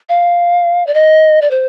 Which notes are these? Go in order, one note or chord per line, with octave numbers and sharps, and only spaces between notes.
F5
D5
D#5
D5
C5